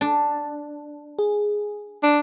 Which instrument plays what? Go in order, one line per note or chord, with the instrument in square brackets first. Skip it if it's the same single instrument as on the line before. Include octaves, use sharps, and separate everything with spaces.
[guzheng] D4
[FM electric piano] G#4
[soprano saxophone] D4